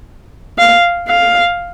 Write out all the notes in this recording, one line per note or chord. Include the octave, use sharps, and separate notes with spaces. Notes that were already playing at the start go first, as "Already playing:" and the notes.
F5
F5